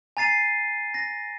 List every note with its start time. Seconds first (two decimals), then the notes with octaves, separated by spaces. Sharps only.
0.17 G#5 A#5 A6 C7 D#7
0.94 A#6